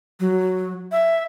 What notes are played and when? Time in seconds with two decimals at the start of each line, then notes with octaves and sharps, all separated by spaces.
0.20 F#3
0.92 E5